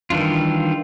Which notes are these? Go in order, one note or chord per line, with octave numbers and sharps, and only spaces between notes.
D#3 E3 G3 D4 F4